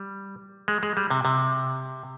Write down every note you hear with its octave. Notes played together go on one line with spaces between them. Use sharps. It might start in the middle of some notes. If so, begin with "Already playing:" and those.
Already playing: G3
G#3
G#3
G3
C3
C3